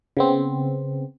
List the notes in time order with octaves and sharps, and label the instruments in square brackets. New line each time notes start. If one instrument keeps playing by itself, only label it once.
[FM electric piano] C#3 B3 C4